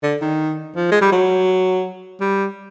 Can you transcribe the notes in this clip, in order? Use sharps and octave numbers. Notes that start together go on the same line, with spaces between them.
D3
D#3
F3
G#3
G3
F#3
G3